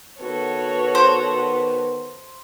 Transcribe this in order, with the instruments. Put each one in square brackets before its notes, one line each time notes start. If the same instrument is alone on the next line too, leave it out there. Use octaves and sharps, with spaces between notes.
[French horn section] D#3 B3 B4 [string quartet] F#4 A4 C#5
[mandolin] C5